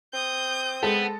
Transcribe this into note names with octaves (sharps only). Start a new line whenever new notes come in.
C4 D#6 G6
G#3 B3 A4